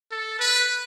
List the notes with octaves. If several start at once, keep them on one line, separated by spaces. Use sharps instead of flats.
A4
B4